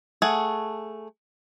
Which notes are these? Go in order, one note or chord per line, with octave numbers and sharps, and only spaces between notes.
A3 G#4 F#5